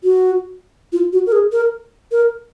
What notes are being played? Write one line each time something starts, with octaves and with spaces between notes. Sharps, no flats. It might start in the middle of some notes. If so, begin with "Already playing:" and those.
F#4
F4
F#4
A#4
G#4
A#4
A#4